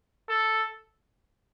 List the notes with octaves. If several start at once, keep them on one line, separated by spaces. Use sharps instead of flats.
A4